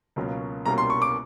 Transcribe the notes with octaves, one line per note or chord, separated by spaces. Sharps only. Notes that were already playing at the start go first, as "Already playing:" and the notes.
C#2 B2 F#3 A#3 C#4
C2 B2 G3 A#3 C#4 A#5
C6
C#6
D6